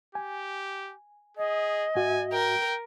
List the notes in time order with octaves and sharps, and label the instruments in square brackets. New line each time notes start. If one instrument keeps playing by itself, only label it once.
[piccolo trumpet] G4 [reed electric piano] G#5
[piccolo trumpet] G#4 [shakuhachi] D#5
[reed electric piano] G#2 F#4 E5 [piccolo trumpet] G#5
[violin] A#4 [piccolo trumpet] G5